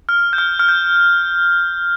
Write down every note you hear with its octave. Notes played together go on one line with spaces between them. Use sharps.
F6
G6
F6
F6
G6